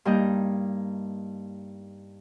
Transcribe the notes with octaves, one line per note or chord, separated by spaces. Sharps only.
G2 G3 A#3 D#4 D#5 G6